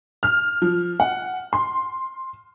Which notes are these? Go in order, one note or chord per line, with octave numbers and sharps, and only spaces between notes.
F6
F3
F#5
C6